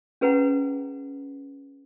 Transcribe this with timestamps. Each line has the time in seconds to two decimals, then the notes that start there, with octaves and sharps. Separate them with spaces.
0.21 C#4 G#4 B4 F#5 A#5